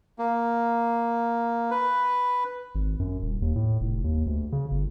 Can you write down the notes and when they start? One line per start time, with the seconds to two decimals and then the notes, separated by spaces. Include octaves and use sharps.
0.19 A#3
1.71 B4
2.75 G#1
3.00 F#2
3.23 D#1
3.42 D#2
3.56 A2
3.81 F1
4.04 D#2
4.26 D2
4.52 C#3
4.71 G1